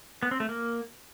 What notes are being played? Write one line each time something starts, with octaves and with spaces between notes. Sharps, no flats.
B3
C4
A3
A#3